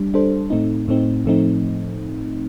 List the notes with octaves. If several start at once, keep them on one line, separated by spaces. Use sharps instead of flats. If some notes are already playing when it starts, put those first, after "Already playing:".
Already playing: G3 D4
G3 D4 A4 C5
A2 A3 C4 D#4
A2 A3 C4 D#4
A2 F3 A3 C4 D#4